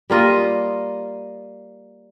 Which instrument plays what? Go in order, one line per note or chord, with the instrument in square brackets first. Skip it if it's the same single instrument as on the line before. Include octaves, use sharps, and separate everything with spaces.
[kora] G3 A#3 F4 D#5